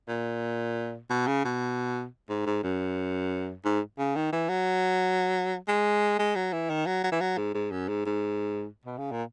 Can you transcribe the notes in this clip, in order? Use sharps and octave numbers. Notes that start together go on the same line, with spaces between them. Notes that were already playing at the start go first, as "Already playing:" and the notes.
A#2
B2
C#3
B2
G#2
G#2
F#2
G#2
C#3
D#3
E3
F#3
G#3
G#3
F#3
E3
D#3
F#3
F#3
E3
F#3
G#2
G#2
F#2
G#2
G#2
B2
C#3
A#2